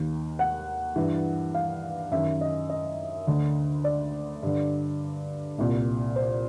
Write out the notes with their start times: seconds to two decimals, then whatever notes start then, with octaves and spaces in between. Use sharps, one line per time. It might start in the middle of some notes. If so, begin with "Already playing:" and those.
Already playing: D#2 D#3
0.39 F#5
0.96 G2 E3
1.54 F5
2.11 F#2 D#3 E5
2.41 D#5
2.70 D#5
3.27 D2 D3
3.84 D5
4.43 G2 D3
5.58 C2 A#2
6.16 C5